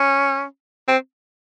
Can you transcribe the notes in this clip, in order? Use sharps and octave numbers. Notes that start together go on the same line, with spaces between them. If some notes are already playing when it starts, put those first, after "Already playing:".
Already playing: C#4
C4